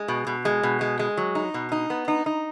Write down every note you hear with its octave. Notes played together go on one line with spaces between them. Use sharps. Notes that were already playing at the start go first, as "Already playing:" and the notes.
Already playing: G#3
B2
B2
G#3
B2
G#3
G#3
F#3
D#4
B2
D#4
B3
D#4
D#4